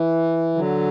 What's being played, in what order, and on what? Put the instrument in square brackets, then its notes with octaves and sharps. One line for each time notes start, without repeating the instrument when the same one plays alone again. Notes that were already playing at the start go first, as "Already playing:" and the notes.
Already playing: [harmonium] E3
D3 F#3